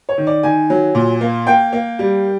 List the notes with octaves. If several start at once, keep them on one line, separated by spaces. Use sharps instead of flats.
C#5
D#3
D5
D#3 G#5
F#3
A#2
A#3
A#3 G5
A#3
G3